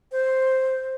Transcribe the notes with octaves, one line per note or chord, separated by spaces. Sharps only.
C5